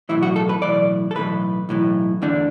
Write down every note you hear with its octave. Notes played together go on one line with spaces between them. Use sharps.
B1 A2 E3 E4
F#4
A4
B4
B1 A2 E3 D5
A4
B1 A2 E3 B4
B1 A2 E3
E2 D3 A3 D4